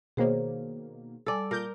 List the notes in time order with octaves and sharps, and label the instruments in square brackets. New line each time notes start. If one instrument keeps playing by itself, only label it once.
[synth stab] B2 D#3 A#3 [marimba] G#4 C5 C#5
[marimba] G3 G#5 E6 [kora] A4 D5
[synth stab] A#2 D6 G6 [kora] A#4